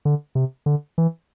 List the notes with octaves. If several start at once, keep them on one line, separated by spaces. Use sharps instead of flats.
D3
C3
D3
E3